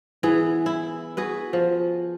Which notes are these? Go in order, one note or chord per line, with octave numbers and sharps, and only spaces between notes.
E3 B3 G#4
E4
F#4 G#4 B4
F3